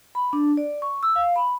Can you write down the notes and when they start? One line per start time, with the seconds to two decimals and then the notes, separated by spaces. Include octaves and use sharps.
0.15 B5
0.33 D4
0.57 D5
0.82 C#6
1.03 E6
1.16 F5
1.36 B5